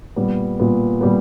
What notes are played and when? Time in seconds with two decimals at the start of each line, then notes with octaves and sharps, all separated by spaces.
0.16 A#2 G3 B3
0.59 A#2 G3 B3
1.01 A#2 G3 B3